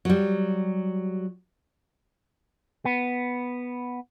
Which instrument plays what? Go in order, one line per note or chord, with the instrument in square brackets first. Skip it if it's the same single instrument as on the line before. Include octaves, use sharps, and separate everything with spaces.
[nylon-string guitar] F#3 G3
[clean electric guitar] B3